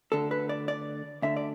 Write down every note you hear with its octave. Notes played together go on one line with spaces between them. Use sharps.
D2 D3 A4
B4
D5
D5
D2 D3 E5
D5